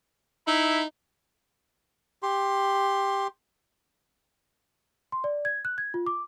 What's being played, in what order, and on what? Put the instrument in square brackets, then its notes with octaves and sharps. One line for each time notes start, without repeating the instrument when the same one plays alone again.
[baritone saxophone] D#4 [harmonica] E4 B5
[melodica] G4 C6
[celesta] C6
D5
G#6
F#6
G#6
F4
D6